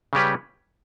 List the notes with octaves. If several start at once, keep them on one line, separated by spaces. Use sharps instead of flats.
C#3 G3 C#4 G4 B4